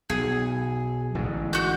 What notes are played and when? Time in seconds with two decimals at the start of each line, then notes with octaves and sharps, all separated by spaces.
0.10 B1 G#4
1.15 A1 G#2 D3
1.53 F#4 G6